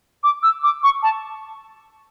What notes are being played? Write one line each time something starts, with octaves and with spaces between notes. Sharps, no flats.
D6
E6
D6
C#6
A5